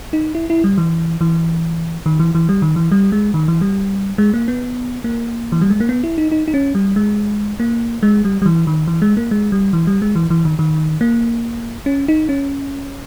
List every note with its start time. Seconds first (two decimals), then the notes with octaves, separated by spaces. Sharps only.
0.13 D#4
0.35 E4
0.50 E4
0.64 G3
0.78 E3
1.21 E3
2.06 D#3
2.19 E3
2.35 E3
2.49 G3
2.62 D#3
2.76 E3
2.91 G3
3.12 G#3
3.34 D#3
3.48 E3
3.61 G3
4.18 G#3
4.34 A#3
4.48 B3
5.04 A#3
5.52 E3
5.61 G3
5.70 G#3
5.80 A#3
5.89 B3
6.04 E4
6.18 D#4
6.32 D#4
6.48 D#4
6.54 C#4
6.75 G3
6.96 G#3
7.60 A#3
8.03 G#3
8.25 G3
8.42 G3
8.46 E3
8.67 D#3
8.88 E3
9.02 G#3
9.17 A#3
9.31 G#3
9.52 G3
9.73 E3
9.87 G3
10.02 G#3
10.15 E3
10.30 E3
10.45 D#3
10.59 D#3
11.01 A#3
11.86 C#4
12.08 D#4
12.29 C#4